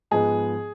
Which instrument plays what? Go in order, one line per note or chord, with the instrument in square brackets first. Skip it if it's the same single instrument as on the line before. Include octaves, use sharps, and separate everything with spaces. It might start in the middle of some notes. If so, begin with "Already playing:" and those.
[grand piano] G#2 F3 G#3 B3 D#4 G#4